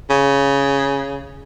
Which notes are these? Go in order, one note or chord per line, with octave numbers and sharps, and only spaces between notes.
C#3